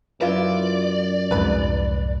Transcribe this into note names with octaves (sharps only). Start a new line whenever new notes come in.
F#2 E4 F4 B4 D5
C2 F2 G#2 B4 B5